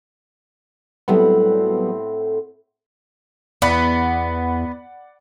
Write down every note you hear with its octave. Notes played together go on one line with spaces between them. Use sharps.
A2 F#3 G3 B3 C4 F#5
E2 B3 D5 F#5 B5